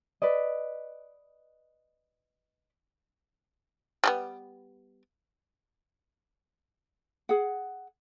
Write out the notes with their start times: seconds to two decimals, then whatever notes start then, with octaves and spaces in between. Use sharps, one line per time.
0.22 B4 D5 D#5
4.04 G3 G#3 B3
7.29 G#4 F#5